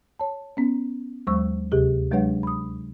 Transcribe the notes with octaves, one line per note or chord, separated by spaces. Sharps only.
C#5 A5
B3 C#4
D#2 F#3 G#3 C5 C#6 E6
D2 C3 G4 G#4
F#3 G#3 D4 B4 C#5 F#5
B5 D#6